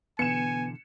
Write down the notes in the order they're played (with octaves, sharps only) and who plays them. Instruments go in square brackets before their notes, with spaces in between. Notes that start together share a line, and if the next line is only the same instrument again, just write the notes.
[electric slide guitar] B2 D3 E3 [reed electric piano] B3 [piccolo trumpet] G#5 [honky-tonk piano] C#7 E7